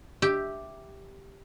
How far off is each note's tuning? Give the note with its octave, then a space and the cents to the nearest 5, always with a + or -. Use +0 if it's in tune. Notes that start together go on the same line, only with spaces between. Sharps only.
G4 +0 E5 +0